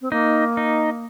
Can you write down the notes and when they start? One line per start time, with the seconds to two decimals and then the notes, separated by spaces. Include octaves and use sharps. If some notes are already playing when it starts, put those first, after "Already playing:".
0.01 C4
0.12 A#3 D#4
0.57 D#4